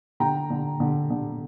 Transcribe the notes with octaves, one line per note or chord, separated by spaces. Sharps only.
D3 G5 A#5
D3
D3
D3